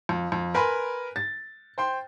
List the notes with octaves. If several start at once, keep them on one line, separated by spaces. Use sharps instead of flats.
F2
F2
A#4 B4 G#5 B5 C6
A6
C5 G5 C6